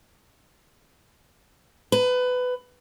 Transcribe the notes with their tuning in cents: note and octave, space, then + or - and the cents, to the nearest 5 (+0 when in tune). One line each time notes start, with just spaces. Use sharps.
B4 +20 A#5 +10